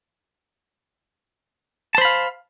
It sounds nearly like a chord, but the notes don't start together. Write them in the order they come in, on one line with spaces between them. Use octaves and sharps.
A5 C5 B5 F5